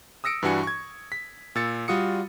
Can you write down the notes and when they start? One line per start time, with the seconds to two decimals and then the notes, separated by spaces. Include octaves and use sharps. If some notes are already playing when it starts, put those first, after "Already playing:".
0.24 D#6 E6 A#6 C#7 D7
0.42 G2 E3 D4 F#4 G#5 C#7
0.63 C#6 G#6
1.12 B6
1.55 A#2 E6 A6 C#7
1.88 G3 F4 F#4 D#6 C#7